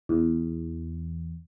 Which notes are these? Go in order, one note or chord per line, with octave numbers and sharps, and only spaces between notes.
E2